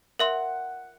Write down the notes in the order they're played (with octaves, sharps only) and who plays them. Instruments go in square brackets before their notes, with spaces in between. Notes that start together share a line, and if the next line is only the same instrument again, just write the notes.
[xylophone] A#4 E5 C6 [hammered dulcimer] F#5